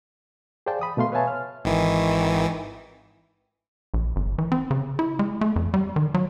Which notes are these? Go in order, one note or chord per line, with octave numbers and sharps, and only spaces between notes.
G#4 C5 D5 F5 G5 A5
B5 D#6
B2 A3 F5 C6
B4 C#5 E5 F5 G#5 A5
F6
G#1 D#3 E3
A#1
G1
E3
C4
C#3
E4
G#3
A3
F2
G3
D#3
F#3